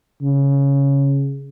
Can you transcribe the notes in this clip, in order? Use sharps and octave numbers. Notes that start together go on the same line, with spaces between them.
C#3